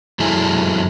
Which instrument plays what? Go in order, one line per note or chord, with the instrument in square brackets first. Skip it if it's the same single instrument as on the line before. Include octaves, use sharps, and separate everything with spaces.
[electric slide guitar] F#2 F#3 G#3 E4 A4 G#5